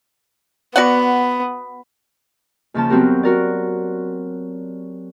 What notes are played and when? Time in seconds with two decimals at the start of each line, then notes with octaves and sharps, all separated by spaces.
0.76 B3 F#4 D5 F#5
2.74 D#2 C#3 F3 A#3 A5
2.90 F#3 B3 C4 F#4 G4 A#4
3.23 F#4 A#4 D5